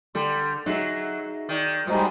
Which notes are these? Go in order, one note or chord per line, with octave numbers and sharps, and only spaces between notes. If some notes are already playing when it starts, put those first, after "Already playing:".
D3 G3 A4 C6
F#3 D#4 G#4 E5
D#3 D5
F#2 G3 G#3 D#4 F#4 C5 G#5